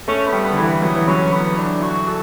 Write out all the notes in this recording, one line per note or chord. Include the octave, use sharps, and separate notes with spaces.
A3 C#4
B3
G3
B3
D3
E3
A3
F#3 B3
E3
F#3 C#4
B3
D4
F#4
A4